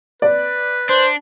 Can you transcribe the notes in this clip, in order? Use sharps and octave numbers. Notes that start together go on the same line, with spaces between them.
B4 D5
D4 C5